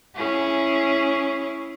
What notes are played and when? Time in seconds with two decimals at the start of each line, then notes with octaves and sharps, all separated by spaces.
0.16 C#4 E4 G#4